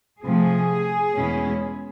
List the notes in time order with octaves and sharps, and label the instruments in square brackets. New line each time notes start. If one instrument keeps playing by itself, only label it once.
[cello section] C3 F3 A3 G#4
E2 B2 G#3 C#4 E4